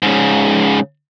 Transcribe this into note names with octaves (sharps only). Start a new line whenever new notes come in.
G#2 C#3